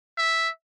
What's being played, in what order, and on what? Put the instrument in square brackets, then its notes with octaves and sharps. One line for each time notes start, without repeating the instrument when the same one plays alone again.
[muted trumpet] E5